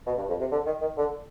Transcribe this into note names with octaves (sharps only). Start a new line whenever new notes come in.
B2
G2
F2
C3
D3
D#3
D#3
D3